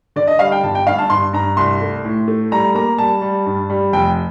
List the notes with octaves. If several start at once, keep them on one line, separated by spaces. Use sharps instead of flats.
D3 D5
D#5
G3 F5
G5
G1 A5
G5
G2 F5
A5
G2 C6
G2 A#5
C2 C6
A3
A2
A3
G3 A#5
A#3 A#5
G3 A5
G3
G2
G3
F1 G5